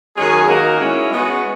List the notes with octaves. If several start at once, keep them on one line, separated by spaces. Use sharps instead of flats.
F#2 D#3 G#3 C#4 G#4
D#3 A#3 D#4 F#4 A#4
G#3 C#4 E4
G#3 B3 F#4